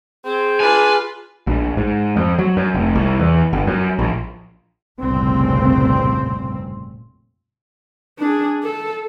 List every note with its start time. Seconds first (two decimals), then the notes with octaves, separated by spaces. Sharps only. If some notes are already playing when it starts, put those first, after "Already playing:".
0.25 C4 G#4
0.60 D4 F4 B4 G#5
1.47 A#1
1.77 G#2
2.16 F2
2.39 F#3
2.57 F#2
2.74 F1
2.95 C2
3.19 E2
3.53 G1
3.67 F#2
3.99 A#1
5.01 F1 C2 G2 A#2 C#3 C4
8.19 D4 G#4
8.64 A4